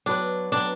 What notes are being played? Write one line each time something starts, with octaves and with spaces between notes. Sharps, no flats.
F#3 B3 D4 F#4 B4
F#3 B3 D4 F#4 B4